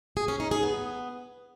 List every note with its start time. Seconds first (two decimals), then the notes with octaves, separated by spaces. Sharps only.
0.17 G#4
0.28 C#4
0.40 D#4
0.51 G#4
0.63 B3